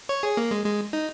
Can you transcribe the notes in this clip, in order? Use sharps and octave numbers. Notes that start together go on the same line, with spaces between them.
C#5
G#4
A#3
G#3
G#3
D#4